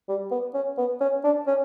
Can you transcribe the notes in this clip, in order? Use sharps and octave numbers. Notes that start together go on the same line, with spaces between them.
G3
B3
C#4
B3
C#4
D4
C#4